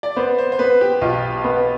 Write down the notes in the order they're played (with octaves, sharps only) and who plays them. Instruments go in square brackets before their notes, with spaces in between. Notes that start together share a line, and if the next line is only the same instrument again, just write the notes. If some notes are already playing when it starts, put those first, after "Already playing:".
[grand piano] D5
[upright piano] B3 [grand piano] C5
[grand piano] C5
C5
[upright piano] B3 [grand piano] B4
[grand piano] G4
[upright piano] B1 [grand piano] F4
[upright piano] B3